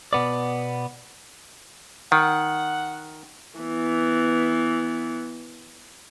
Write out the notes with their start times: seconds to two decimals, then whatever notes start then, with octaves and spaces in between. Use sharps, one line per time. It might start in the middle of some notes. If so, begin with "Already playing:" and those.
0.13 B2 B3 D5
2.12 D#3 F#5
3.59 E3 B3